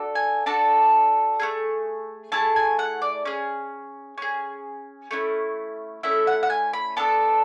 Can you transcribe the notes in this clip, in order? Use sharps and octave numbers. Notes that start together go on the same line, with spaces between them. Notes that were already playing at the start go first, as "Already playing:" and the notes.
Already playing: D4 F#4 A4
G#5
D4 F#4 A4 A5
A3 E4 G#4
A3 E4 G#4 A5
G#5
F#5
D5
C#4 G#4
C#4 G#4
A3 C#4 E4
A3 C#4 E4 E5
F#5
F#5
G#5
B5
B3 D4 A4 A5